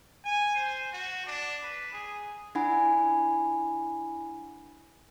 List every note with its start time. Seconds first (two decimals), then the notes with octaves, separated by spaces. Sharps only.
0.25 G#5
0.55 C5
0.93 F#4
1.26 D4
1.63 B4
1.93 G#4
2.55 D4 E4 F#5 G#5 B5